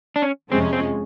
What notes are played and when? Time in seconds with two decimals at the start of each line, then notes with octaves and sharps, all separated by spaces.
0.16 D4
0.22 C#4
0.50 F2 C3 F3 G#3 C4 C#4
0.73 C4